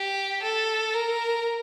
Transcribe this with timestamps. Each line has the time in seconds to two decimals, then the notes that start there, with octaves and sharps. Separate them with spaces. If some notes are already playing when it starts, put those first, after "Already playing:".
Already playing: G4
0.43 A4
0.94 A#4